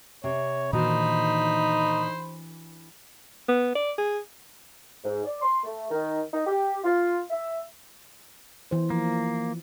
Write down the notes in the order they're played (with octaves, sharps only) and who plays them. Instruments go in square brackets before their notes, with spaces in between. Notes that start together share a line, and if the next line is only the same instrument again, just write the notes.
[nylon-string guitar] C3 [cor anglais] C#5
[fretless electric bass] A#2 D#3 [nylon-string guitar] E3 D4 F#4 [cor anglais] D#4 [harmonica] C5 B5
[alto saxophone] B3
D5
G#4
[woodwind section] G#2
D5
C6
A3
D#3
D#4
G4
F4
E5
[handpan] E3 C5
[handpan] F3 [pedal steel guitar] A#3